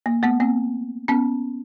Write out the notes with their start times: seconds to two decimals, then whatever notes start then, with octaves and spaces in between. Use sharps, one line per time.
0.06 A#3
0.23 A3 B3
0.40 A#3 C4
1.08 B3 C#4